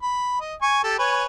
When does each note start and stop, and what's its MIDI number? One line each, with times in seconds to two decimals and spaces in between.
0.02 0.37 83
0.41 0.54 75
0.62 0.79 80
0.62 0.79 85
0.84 0.97 67
0.84 0.97 69
0.99 1.26 71
0.99 1.26 73
0.99 1.26 80